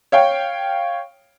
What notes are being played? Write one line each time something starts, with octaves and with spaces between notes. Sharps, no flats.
C#5 F5 G5